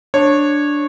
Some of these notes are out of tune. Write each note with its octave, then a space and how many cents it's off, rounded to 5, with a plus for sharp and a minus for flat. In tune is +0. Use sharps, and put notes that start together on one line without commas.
D4 +0 C#5 -15